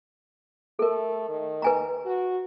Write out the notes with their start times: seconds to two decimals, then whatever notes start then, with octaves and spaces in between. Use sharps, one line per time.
0.79 A3 A4 A#4
1.29 D#3
1.62 B4 G#5 A#5
2.05 F#4